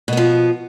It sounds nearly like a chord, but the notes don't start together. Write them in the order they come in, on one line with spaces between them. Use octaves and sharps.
B2 B3 F3